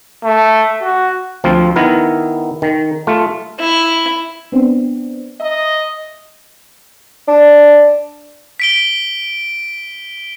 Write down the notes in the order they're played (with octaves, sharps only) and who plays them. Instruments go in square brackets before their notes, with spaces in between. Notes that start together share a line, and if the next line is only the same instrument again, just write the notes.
[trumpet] A3
F#4
[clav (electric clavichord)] D2 F3 C4 F4
D#3 B3 E4 A#4
D#3
A3 F4
[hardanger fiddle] E4
[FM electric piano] B3 C4 D4
[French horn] D#5 [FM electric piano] E5 A#5
[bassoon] D4
[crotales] B6 D7 G7